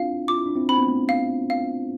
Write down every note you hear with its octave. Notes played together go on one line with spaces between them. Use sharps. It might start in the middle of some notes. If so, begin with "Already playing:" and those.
Already playing: C4 D4 E4 F4 F5
F4 D6
E4
D4
C4 E4
C4 B5
B3
A3 C4
F5
F5